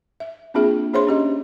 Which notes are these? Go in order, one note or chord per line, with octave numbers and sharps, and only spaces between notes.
E5
A#3 C4 D4 F4 G#4 E5
D4 G#4 C5 C#5 E5 C6
C#4 G4 D#5